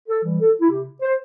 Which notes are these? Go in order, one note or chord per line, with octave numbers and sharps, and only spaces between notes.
A4
E3 G3
A4
E4
C3 G4
C5